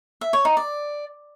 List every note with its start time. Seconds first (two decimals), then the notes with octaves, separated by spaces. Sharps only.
0.21 E5
0.33 C#5
0.45 D#4
0.57 D5